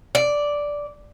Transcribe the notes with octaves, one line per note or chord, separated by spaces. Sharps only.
D5